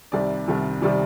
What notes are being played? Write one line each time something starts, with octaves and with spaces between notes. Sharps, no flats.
C2 C3 D#3 G3 D5
C2 C3 D#3 G3
C3 D#3 G3 D5